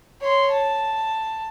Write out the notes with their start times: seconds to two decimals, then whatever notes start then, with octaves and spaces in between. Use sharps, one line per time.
0.21 C#5 C6
0.52 A5